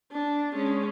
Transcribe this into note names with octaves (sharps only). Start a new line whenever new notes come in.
D4
G#3 C#4